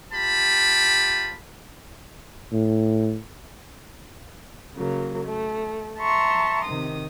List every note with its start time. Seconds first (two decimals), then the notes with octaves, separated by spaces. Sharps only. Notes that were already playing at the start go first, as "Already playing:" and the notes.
0.13 F4 G4 A5 B5
2.53 A2
4.75 C#3 F#3 A#3
5.24 A3
6.00 E5 A5 A#5 C6 C#6
6.63 C3 D#3 D#6